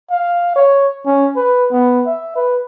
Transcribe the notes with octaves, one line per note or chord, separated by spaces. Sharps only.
F5
C#5
C#4
B4
B3
E5
B4